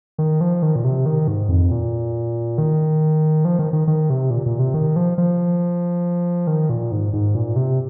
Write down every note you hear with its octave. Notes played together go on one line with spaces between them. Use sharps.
D#3
F3
D#3
A#2
C3
D#3
G#2
F2
A#2
D#3
F3
D#3
D#3
D#3
C3
A#2
A#2
C3
D#3
F3
F3
D#3
A#2
G#2
G#2
A#2
C3